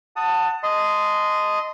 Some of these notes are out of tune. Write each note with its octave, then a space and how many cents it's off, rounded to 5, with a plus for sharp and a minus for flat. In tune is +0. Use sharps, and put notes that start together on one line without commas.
F#5 +0 A5 +25 D#6 +0
D#5 +0 A5 +0 C6 -20